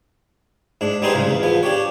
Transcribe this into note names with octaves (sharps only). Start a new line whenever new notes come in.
G#2 D4
G3 B3 C4 D#4 G#4 C5
C2 G#2 C#3
E2
E2 F3 B3
D4 G4 C#5